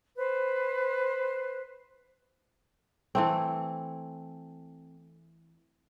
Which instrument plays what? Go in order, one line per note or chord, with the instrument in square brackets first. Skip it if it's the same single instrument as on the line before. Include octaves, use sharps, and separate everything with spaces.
[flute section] B4 C5
[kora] E3 A3 C4